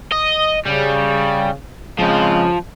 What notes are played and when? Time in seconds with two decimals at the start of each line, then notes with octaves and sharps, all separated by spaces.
0.12 D#5
0.66 C#3 G3
1.99 C#3 F3 G#3 C4